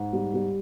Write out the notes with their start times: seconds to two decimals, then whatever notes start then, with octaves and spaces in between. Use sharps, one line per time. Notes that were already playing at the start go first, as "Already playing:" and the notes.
Already playing: G#2
0.13 G3
0.34 G3